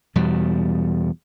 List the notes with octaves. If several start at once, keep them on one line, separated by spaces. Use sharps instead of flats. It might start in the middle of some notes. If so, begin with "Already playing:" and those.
E2 B2 G3